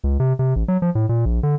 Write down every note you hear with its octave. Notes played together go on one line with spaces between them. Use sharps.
C#2
C3
C3
A1
F#3
F3
A2
A#2
A#1
D3